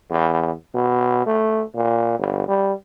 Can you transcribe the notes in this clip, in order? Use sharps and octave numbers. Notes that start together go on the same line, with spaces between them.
E2
B2
A3
A#2
G1
G3